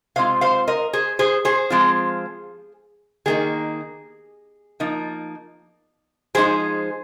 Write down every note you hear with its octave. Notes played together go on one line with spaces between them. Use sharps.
C3 G#3 C4 F4 C5 F5
C5 F5
A#4 D#5
G#4 C5
G#4 C5
G#4 C5
F3 G#3 C4 F4
D#3 A#3 D#4 G#4
F3 A#3 D#4
F3 G#3 D#4 G#4 C5